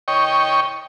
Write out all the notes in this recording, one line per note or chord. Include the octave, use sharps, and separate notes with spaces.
C#5 D#5 G5 C#6